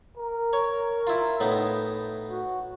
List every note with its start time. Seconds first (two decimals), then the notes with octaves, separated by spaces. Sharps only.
0.17 A#4
0.53 C#5
1.07 E4 F4
1.40 A2 B3 D#4
2.30 F#4